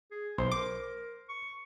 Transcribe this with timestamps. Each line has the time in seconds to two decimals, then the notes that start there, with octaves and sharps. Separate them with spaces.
0.11 G#4
0.38 B1 C5 C6
0.51 A#4 D6
1.29 C#6